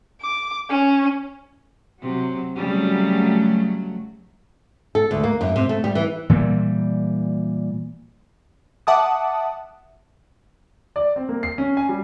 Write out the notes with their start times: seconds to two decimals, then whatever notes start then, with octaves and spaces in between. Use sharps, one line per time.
0.21 D6
0.69 C#4
2.01 C3 F#3
2.56 C#3 F#3 G3 A3
4.95 A4
5.11 D2
5.24 A#3
5.41 F#2
5.56 C3
5.69 A3
5.84 G3
5.95 E3
6.29 A#2 E3 G3
8.87 E5 F#5 A5 D6 D#6
10.96 D5
11.16 C4
11.29 A#3
11.43 C7
11.58 C#4
11.77 G#5
11.89 G3